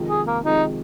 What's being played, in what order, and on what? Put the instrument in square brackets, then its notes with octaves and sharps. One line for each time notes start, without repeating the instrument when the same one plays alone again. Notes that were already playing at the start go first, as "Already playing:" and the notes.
Already playing: [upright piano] F2 C3 D#3 G#3
[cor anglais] G#4
A#3
[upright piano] F2 C3 D#3 G#3 [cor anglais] D#4